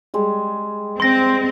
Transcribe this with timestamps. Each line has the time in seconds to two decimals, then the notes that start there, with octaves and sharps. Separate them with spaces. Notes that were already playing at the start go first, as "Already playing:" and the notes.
0.14 G3 G#3
1.00 C4 C6 A#6